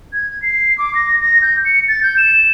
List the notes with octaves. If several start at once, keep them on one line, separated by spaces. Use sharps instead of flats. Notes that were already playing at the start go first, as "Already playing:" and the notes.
G#6
C7
D6
A#6
A#6
G6
C#7
A6
G6
E7